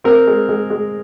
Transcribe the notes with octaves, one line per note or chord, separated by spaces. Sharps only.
C4 A#4
G#3
G#3
G#3